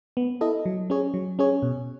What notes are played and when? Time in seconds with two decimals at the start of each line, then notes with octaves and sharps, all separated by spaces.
0.17 B3
0.41 E4 A4 D#5
0.65 F#3
0.90 C#4 G#4 C#5
1.14 F#3
1.39 C#4 G#4 C#5
1.62 B2